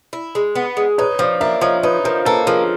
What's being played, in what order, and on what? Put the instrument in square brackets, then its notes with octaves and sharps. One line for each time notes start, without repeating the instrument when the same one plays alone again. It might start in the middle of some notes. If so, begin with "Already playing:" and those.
[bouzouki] E4
G#3
B3
G#3
[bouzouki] D#4 [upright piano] B4 C#5
[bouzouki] F3 [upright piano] C5 D5
[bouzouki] A#3 [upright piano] D5 E5
[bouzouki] F3 [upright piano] C#5 D#5
[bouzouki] D#4 [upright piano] B4 C#5
[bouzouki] F3 [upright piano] A#4 C5
[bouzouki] A#3 [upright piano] A4 B4
[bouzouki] F3 [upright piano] G#4 A#4